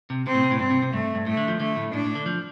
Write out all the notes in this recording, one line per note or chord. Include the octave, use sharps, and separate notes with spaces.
C3
C3 C4
A2
C3
A2
G2 C4
C3
C3
G2 A3
G2
A2 A3
D3
F3
D3 A3
A2
A2 D4
A2
D3
F3